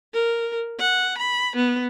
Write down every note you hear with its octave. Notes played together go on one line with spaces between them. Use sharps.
A#4
F#5
B5
B3